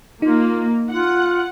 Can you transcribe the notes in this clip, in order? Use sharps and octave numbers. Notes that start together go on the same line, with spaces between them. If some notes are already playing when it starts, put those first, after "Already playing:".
A#3 D#4 F4
F4 F#5